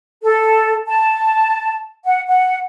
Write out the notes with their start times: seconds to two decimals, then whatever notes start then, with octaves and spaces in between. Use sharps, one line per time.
0.23 A4
0.87 A5
2.05 F#5
2.28 F#5